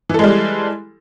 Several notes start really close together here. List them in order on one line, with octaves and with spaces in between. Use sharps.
E3 A4 G#3 G3